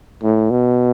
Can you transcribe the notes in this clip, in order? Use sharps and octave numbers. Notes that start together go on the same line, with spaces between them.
A2
B2